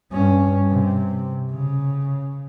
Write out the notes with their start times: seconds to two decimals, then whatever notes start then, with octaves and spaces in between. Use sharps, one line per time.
0.11 G2 C#4
0.71 C3
1.52 C#3